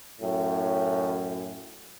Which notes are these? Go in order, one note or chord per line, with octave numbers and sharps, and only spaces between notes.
F#2 A2